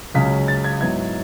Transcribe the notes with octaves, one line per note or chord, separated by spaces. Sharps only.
C#2 C#3 F#3 B6
A6
G#6
G#2 F#3 B3 E4 G#6